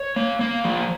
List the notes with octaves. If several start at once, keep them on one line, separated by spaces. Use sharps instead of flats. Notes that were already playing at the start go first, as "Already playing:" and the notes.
Already playing: C#5
A#3
A#3
F3